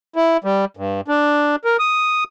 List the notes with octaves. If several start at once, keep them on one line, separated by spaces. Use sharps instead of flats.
E4
G3
G2
D4
A#4
D#6